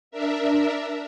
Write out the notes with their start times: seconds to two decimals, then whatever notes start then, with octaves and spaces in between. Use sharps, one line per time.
0.11 D4 A#4 E5